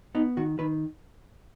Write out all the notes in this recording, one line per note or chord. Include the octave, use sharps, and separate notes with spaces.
B3 D#4
D#3 F#4
D#3 B4